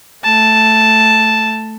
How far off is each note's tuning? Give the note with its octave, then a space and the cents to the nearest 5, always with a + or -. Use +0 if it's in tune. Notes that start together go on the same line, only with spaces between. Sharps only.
A3 +0 A5 +0